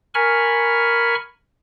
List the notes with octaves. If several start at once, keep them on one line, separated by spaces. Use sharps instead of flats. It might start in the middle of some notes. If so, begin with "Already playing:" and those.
A#4 G#5 B5 C#6 F6